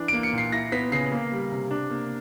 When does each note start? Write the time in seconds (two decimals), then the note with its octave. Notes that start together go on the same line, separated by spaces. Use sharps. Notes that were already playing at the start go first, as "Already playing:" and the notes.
Already playing: E3 D4
0.08 D7
0.13 A#3
0.23 C#7
0.33 A#2
0.38 C7
0.52 E4 A#6
0.72 B3 B6
0.92 C#3 C7
1.12 A#3
1.32 G3
1.51 C3
1.71 D4
1.90 A#3